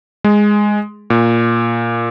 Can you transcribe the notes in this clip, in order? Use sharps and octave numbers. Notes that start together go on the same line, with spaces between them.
G#3
A#2